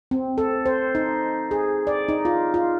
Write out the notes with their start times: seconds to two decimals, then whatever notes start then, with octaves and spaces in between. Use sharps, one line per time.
0.11 C4
0.38 A4
0.66 C5
0.95 D#4
1.51 G#4
1.87 D5
2.08 D#4
2.25 F4
2.54 F4